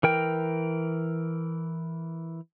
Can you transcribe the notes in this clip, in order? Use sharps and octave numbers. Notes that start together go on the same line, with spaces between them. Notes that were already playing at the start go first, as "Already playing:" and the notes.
E3 A#4 G5